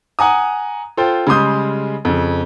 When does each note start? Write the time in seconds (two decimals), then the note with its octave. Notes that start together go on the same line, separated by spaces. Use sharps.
0.19 F#5 G#5 A#5 D#6
0.97 F4 A4 C5 G5
1.27 C#3 G3 G#3 C6 D#6 G6
2.05 F2 C#3